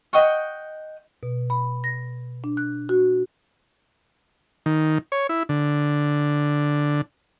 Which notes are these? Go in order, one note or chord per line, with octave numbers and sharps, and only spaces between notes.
D#5 F#5 G5 C#6
B2
B5
A#6
D4
F#6
F#4
D#3
C#5
E4
D3